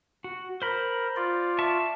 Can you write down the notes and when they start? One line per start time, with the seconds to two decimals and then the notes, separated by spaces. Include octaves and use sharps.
0.24 F#4
0.62 A#4 C5 B5
1.16 F4 D5
1.59 E5 A5 C#6